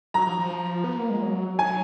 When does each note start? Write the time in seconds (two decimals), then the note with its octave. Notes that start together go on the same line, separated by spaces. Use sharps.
0.14 F#3 A#5
0.27 F3
0.39 F3
0.84 B3
0.97 A#3
1.10 G#3
1.22 F#3
1.58 F#3 G#5